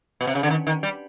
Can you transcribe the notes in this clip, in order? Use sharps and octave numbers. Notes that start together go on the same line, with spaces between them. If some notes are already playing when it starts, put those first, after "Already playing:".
B2
C3
C#3
D3
D#3
D#3
G3